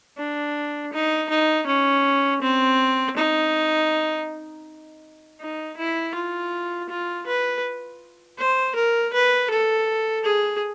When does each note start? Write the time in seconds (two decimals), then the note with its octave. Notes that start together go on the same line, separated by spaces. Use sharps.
0.17 D4
0.93 D#4
1.29 D#4
1.67 C#4
2.41 C4
3.16 D#4
5.40 D#4
5.77 E4
6.15 F4
6.89 F4
7.27 B4
8.38 C5
8.75 A#4
9.13 B4
9.51 A4
10.25 G#4